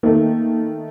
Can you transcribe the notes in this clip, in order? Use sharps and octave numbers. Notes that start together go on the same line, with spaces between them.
D#3 A3 A#3